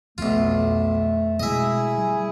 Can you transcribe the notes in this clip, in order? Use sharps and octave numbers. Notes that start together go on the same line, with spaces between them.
B1 F2 A3 F4
B2 G#3 E4 G#4 D#5 E5
G3 G#5